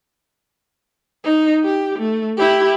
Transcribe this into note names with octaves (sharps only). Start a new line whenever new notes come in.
D#4
G4
A3
E4 G4